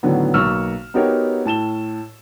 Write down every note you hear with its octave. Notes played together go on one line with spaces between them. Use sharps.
A2 D3 D#3 F#3 B3
B1 A#3 C#6 E6 F6
B3 D#4 F#4 G4 A#4 C#5
A2 A5 E7 G7